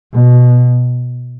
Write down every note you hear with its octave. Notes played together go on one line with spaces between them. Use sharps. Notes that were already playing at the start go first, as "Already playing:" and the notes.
B2